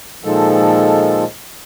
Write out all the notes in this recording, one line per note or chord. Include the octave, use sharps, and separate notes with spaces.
A#2 D#3 F3 G#3 A4